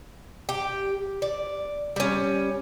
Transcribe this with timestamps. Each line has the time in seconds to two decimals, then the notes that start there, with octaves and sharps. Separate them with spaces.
0.49 G4
1.22 D5
1.96 G3 C#4